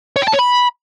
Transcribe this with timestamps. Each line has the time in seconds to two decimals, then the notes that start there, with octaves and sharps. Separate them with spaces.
0.16 C#5
0.22 G5
0.28 A5
0.33 C#5
0.39 B5